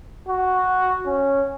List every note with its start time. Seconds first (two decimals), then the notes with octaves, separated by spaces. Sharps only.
0.29 F#4
1.06 C#4